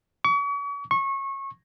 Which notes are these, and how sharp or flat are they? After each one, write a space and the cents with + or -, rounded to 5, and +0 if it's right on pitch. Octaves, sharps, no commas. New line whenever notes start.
C#6 +40
C#6 -25